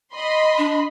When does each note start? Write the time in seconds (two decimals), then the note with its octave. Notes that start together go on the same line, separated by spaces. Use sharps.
0.12 D#5 B5 C6
0.58 D4